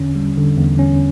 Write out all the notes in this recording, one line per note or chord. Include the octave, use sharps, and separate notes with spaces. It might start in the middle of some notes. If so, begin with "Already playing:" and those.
Already playing: E2 D3 C#4
G3
D3
E2
C#4